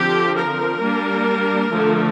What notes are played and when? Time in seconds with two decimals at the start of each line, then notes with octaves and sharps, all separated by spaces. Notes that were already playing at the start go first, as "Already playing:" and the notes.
Already playing: D3 F3 C4 G4
0.35 A#4
0.80 G3 A#3 D4
1.70 D3 F3 A3